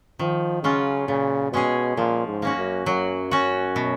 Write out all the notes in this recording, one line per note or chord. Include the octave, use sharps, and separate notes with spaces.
D#3 F3
C#3 F#3 C#4 F4
A#2 C#3
B2 G#3 C#4 G#4
A#2 F3
G#2
A#3 C#4 F#4
F#2
F#2 F#3
C#4 F#4
B2